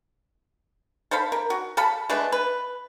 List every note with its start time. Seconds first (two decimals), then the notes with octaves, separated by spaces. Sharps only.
1.11 A4 C5 F5 B5
1.32 A#4
1.50 F#4
1.77 A4 F5 A5 B5
2.09 G#3 A3 D4 B4
2.32 B4